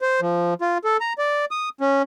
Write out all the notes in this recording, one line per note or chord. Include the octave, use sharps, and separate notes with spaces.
C5
F3
F4
A4
A#5
D5
D#6
C#4